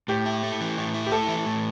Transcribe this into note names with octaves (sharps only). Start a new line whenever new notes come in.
A2 G4
E4
A3
E3
A2
E4
G4
A3 A4
E3
A2